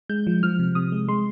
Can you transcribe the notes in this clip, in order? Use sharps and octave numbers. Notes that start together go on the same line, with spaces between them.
G#3 G6
F3
F3 F6
C3
C3 D#6
G#3
G#3 C6